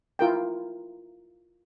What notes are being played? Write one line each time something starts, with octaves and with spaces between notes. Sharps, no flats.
E4 F4 A#4 G5